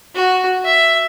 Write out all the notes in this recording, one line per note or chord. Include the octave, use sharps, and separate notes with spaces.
F#4
E5